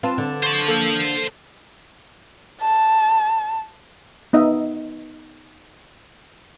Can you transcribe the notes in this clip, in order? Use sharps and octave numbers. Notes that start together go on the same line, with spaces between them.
C4 F4 B4 A5
D3
C5 A5 C6 C#6 G#6
A#3 A4
A5
B3 D#4 D#5 E5